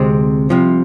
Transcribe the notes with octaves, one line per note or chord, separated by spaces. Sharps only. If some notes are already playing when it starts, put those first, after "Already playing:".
Already playing: D2 C3 G#3 C4
C2 C3 F3